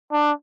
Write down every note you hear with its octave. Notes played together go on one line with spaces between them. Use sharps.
D4